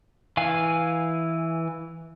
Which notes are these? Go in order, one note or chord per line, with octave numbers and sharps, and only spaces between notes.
E3 F5 G#5